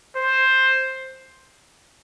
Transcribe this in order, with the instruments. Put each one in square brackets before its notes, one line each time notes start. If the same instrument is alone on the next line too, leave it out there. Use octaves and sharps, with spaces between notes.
[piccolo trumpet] C5